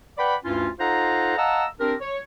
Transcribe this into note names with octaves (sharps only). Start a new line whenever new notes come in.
B4 D5 F#5 G5 B5
D2 G2 C#4 E4 F4
D#4 F4 A4 C5 F#5 A#5
D#5 F5 F#5 A5 A#5 E6
C4 D4 G4 A#4
C#5